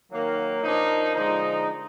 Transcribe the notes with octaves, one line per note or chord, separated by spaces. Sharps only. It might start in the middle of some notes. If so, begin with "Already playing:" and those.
D#3 F#3 A#3
A#2 F3 A#3 D4 D#4
D3 F3 G#3 D#4